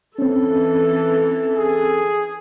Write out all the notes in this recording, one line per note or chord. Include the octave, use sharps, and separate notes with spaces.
E3 C4 C#4 A4
G#4